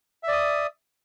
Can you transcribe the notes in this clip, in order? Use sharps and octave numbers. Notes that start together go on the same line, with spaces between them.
D5 E5 D#6